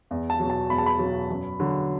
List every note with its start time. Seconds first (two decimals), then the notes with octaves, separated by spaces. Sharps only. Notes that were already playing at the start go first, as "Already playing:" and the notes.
0.11 E2
0.30 A5
0.40 B2 F#3
0.50 A5
0.70 E2 B5
0.78 A5
0.86 B5
0.99 B2 F#3
1.30 F#2
1.60 D3 F#3